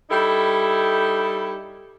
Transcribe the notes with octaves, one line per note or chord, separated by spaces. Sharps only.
G3 D#4 E4 G4 A4